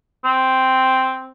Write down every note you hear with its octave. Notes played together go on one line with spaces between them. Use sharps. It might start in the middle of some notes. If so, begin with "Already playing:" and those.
C4